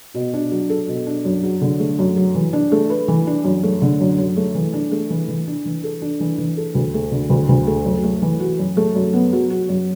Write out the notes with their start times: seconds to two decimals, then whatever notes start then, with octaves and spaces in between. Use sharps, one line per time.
0.15 B2
0.33 D4
0.51 F#3
0.70 A4
0.88 B2
1.06 D4
1.25 F#2
1.43 F#3
1.61 D3
1.80 A3
1.99 F#2
2.16 F#3
2.35 E3
2.53 D4
2.72 A3
2.90 B4
3.08 E3
3.27 D4
3.44 F#2
3.63 A3
3.82 D3
4.00 F#2
4.18 F#2
4.37 A3
4.55 E3
4.73 D4
4.91 A3
5.10 E3
5.28 E3
5.47 D4
5.65 E3
5.84 A4
6.02 D4
6.20 E3
6.38 E3
6.57 A4
6.75 D2
6.94 A3
7.12 D3
7.30 D2
7.49 D2
7.67 A3
7.85 F#2
8.03 A3
8.22 E3
8.40 F#4
8.59 F#2
8.77 A3
8.95 F#2
9.13 B3
9.33 F#3
9.50 F#4
9.69 F#2